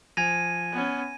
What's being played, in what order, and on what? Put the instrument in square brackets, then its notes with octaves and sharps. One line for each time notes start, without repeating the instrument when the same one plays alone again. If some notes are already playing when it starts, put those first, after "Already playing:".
[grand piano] F3 F7 [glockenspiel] G#5 G#6 A#6 [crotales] D#7
[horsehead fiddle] B3 C#4